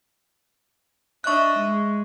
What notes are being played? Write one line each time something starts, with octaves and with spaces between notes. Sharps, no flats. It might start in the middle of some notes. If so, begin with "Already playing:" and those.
D4 D#5 E5 C#6 F#6
G#3